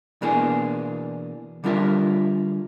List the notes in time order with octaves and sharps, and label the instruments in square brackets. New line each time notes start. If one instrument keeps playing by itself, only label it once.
[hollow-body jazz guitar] B2 E3 A#3 D4 G#4
D3 G3 D4 F4 A#4 E5